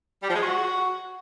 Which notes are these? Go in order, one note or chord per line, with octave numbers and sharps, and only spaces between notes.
G3
F3
G#3
F#4